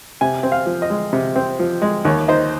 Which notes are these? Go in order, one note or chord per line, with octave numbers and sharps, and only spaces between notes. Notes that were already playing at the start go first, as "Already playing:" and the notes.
C3 G#5
C4
F5
F3
D#5
G#3
C3
C4
F3
G#3
D#2 C#5
D#4 C5